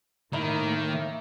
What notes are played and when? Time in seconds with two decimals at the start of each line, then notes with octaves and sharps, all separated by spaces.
0.33 A2 D#3 A#3 D#4 E4 E5